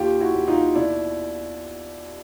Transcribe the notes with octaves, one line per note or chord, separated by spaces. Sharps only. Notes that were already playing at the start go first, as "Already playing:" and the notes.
Already playing: D#2 F4 G4
E4 F#4
D#2
D#4 F4
B2 D4 E4